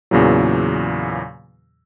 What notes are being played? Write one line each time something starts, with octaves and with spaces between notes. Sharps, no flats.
E2 A#2 C#3 E3 F#3